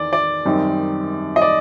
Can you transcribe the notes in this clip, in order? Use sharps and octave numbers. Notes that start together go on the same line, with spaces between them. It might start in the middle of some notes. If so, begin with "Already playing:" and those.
Already playing: E2 D#3 D5
D5
F#2 D#3 G3 C4 D#4
D#5
D5